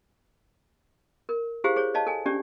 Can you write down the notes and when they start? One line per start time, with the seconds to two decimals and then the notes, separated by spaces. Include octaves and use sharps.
1.29 A#4
1.64 E4 G4 G#4 C5 F5
1.76 G#4 C5 C#5
1.94 C#5 D#5 F5 A5
2.07 A4 G#5
2.26 C#4 D4 G4 D5